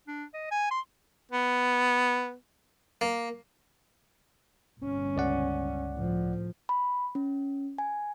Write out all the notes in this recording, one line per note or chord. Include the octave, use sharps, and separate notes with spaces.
D4
D#5
G#5
C6
B3
A#3
G1 C#4
C#2 D5 F#5
A2 F3
B5
C#4
G#5